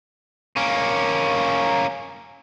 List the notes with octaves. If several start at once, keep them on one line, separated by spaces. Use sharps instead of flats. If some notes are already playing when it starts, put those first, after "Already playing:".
A#3 C#4